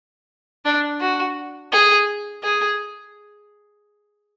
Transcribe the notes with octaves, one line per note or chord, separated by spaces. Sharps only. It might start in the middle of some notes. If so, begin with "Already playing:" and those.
D4
F#4
G#4
G#4